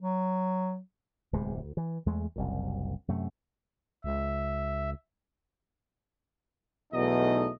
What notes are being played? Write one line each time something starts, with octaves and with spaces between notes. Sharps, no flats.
F#3
D1 E2 C3 G#3
D2
E3
E2 G#3 A3
F#1 C2 F#2
F#2 C3 A3
C#2 E5
B1 E2 B2 A3 D#4 D#5